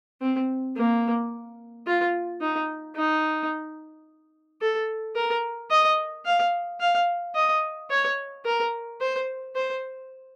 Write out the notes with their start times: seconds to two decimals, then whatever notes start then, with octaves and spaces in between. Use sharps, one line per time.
0.21 C4
0.76 A#3
1.87 F4
2.41 D#4
2.95 D#4
4.61 A4
5.16 A#4
5.71 D#5
6.25 F5
6.80 F5
7.35 D#5
7.90 C#5
8.45 A#4
9.01 C5
9.56 C5